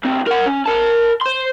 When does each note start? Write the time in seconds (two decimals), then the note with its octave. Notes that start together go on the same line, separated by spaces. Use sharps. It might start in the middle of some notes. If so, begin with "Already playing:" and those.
0.04 C#2 C4
0.27 A#4 F#5
0.46 C#4
0.66 A#4 A5
1.21 C5 C6